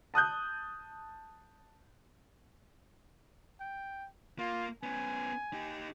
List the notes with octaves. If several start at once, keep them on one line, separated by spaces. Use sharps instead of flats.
A5 D#6 F#6 G6
G5
A#3 F4
B3 C#4 G#5
D#4 G4